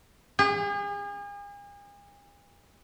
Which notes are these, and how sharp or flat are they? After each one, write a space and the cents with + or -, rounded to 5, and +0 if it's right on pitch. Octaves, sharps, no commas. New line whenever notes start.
G#4 -40